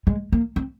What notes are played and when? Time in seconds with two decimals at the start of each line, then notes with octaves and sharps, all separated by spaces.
0.07 G#3
0.32 A#3
0.56 C4